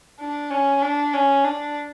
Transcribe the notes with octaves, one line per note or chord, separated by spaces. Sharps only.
D4
C#4
D4
C#4
D4